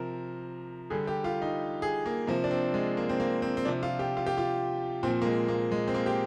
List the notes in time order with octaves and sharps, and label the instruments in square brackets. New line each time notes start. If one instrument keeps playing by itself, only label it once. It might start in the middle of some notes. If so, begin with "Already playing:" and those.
Already playing: [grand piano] C3 F3 A#4
D3 G3 G#4
G4
F4
D#4
G#4
A#3
C3 F3 A#3
D4
C4
G#3
A#3
C4
A#3
C4
C4
C3 F3 D4
F4
G4
F4
G4
F4
A#2 F3 C4
A#3
G#3
A#3
G#3
C4
A#3
G4